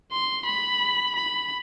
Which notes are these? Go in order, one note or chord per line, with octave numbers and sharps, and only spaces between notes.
C6
B5
B5